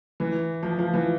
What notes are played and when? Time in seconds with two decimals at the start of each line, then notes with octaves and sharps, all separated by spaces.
0.20 E3
0.63 F3
0.79 F3
0.93 E3